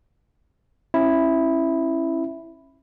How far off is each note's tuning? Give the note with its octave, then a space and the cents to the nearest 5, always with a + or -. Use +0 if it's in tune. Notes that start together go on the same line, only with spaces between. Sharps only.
C#4 -30 E4 +0